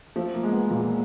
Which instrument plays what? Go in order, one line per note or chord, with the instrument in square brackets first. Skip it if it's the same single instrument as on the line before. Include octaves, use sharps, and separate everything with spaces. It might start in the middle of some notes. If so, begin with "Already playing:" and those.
[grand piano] F3 [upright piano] A3
[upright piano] A#3
[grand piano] G#3
[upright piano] B3
[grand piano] A#2 [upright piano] A#3